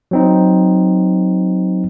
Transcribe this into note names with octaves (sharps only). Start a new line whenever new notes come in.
F#3 C4 D#4